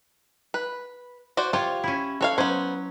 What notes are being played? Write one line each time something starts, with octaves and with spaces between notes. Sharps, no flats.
B4
F#4 C5 D5
F4 G4 C5 C#5 F5
C#4 E4
F#4 A4 C#5 F5
F#3 B3 C#4 C5